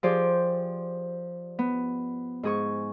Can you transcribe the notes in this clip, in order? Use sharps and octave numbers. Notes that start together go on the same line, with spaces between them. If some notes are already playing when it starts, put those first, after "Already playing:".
F3 G4 G#4 C5 D5
B3
G#2 G#4 C#6